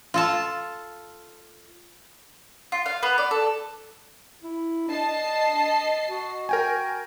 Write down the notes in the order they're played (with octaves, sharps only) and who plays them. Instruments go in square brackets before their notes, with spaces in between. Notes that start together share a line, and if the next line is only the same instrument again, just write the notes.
[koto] F4 A4 A5
[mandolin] F4
F5
B3
D5
A4
[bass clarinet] E4
[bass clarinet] D4 [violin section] D#5 A5 C7
[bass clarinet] F#4
[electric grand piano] A#4 G5 G#5